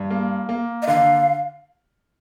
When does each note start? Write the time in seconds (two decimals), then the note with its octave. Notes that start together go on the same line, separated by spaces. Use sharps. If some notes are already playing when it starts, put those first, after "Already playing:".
Already playing: G2
0.10 A#3
0.49 A#3
0.82 D#5
0.87 D3 F5